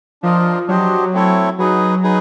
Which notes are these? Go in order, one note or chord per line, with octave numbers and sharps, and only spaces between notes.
F3 D4 F4 A#4 D#5
F#3 D4 G4 C5 D#5
A3 C4 E4 A4 C#5
F#3 D#4 G#4 B4
D#4 G#4 B4